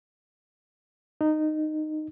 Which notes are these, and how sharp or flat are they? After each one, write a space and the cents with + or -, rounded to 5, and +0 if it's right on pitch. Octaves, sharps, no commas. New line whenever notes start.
D#4 -15